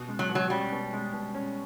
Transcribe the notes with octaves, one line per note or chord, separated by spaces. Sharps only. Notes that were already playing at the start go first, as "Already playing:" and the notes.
Already playing: B2
G#3
F#3
B2
F#3
G3 C#4
B2
G#3
B2
C#4